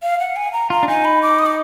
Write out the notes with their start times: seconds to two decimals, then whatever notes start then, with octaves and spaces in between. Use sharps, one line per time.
0.03 F5
0.20 F#5
0.36 G#5
0.53 A#5
0.70 F4 A#5
0.83 D4
0.88 D#4 G#5
1.04 B5
1.22 D6
1.39 D#6
1.46 D6